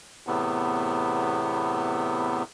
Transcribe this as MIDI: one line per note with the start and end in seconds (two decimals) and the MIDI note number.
0.27 2.43 40
0.27 2.43 45
0.27 2.43 48
0.27 2.43 59